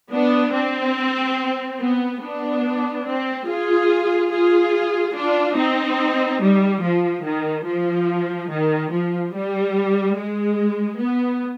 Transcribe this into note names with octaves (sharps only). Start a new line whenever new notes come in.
B3 D4
C4
B3
B3 D4
C4
F4 G#4
F4 G#4
D4 F4
C4 D#4
G3
F3
D#3
F3
D#3
F3
G3
G#3
B3